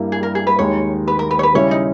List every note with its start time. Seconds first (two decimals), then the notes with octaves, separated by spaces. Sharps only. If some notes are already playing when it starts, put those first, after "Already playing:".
Already playing: G2 G3 A#3 E4
0.12 G#4
0.23 A#4
0.35 G#4
0.47 B4
0.59 D#2 D#3 G#3 C#5
1.08 B4
1.19 A#4
1.31 B4
1.39 C#5
1.43 B4
1.55 C#3 G3 C#4 E4 C#5
1.71 D#4